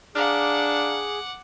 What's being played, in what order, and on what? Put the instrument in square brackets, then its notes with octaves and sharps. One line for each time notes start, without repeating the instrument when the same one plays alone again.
[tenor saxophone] D4 [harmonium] G#4 [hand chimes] F5 A#5 F6 [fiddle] F#5 D6